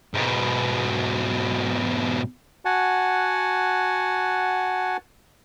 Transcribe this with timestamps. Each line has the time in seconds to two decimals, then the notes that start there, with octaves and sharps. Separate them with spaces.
0.14 G#2 B2
2.65 F#4 F#5 G#5 A5